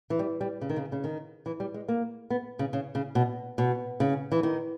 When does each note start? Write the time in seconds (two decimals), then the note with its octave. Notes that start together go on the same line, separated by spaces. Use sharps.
0.10 E3
0.19 G3
0.41 G3
0.61 C#3
0.70 D#3
0.76 C#3
0.92 C#3
1.04 D#3
1.46 E3
1.60 G3
1.74 G#3
1.88 A#3
2.30 B3
2.59 C#3
2.73 C#3
2.95 C#3
3.15 B2
3.58 B2
4.00 C#3
4.32 E3
4.43 D#3